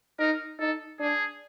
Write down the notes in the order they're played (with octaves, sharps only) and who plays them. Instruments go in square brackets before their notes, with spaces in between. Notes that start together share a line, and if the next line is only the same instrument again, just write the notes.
[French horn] D#4 [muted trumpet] A#4
[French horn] D#4 [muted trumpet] A4
[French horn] D4 [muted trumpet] G#4